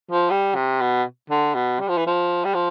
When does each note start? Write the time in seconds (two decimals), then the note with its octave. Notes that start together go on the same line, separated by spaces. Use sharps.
0.11 F3
0.30 G3
0.55 C3
0.81 B2
1.30 D3
1.54 B2
1.80 G3
1.88 F3
1.97 E3
2.06 F3
2.45 G3
2.54 F3